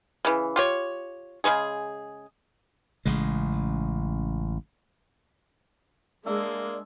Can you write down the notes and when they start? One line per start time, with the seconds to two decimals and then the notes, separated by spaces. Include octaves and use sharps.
0.25 C#3 E3
0.56 F4 G4 C#5
1.44 C#3 G3 G#3 G#4
3.06 A1 C#3 G#3
6.26 G#3 A#3 D4 D5 E5 A5